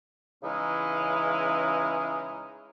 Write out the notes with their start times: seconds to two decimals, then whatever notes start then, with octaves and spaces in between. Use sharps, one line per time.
0.43 C#3 E3 G#3 C#4 D#4 E4